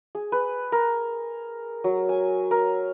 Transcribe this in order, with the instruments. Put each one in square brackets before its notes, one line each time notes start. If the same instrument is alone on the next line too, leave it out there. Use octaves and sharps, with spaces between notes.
[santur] G#4
B4
A#4
F#3
G#5
A#4